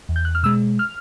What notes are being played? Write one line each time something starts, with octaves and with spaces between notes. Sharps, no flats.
E2
G6
F#6
F6
B2 G#3 E6
F6